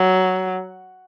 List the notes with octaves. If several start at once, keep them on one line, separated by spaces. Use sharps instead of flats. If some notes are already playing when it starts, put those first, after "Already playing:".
Already playing: F#3